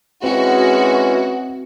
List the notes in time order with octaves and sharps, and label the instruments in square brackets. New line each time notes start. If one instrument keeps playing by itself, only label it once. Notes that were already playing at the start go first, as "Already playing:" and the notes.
[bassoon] E3 [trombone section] G#3 C#4 [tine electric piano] C4 [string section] F#4